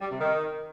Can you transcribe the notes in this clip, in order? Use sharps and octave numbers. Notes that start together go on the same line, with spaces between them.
G3
C3
D#3